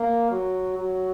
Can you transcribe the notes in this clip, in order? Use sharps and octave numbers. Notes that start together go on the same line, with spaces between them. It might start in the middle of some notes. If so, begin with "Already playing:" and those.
Already playing: A#3
F#3
F#3